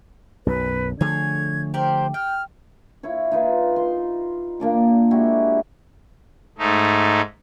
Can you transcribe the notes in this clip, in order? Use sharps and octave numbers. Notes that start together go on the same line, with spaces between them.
B1 F#2 B4
D3 F3 A3 G#4 C#5 G#6
G4 A#4 C5 D5
G5 F6
E4 F4 C#5
D#4 F4 B4
C6
A#2 A#3 D4 D6
G#3 E4 F#4 G4
G#2 A3 D#4